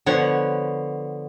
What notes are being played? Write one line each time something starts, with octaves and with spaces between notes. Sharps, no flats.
D3 F3 B3 C#5 F#5